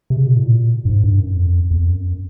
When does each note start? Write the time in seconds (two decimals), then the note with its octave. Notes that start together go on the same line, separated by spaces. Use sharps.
0.10 C3
0.16 C#3
0.27 B2
0.36 A2
0.46 A#2
0.85 G2
0.90 G#2
1.04 G2
1.19 F#2
1.34 F2
1.71 E2
1.77 F2
1.92 F#2